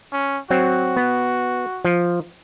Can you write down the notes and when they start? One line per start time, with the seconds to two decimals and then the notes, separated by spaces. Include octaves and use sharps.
0.12 C#4
0.50 F#3 C4 F#4
0.97 B3
1.85 F3